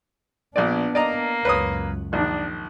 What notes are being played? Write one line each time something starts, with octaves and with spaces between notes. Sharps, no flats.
A#1 A#2 B3 D4 D5
A#3 D5 D#5 A#5
C#2 F#2 B4 C#5 D#6
A#1 D#3 D4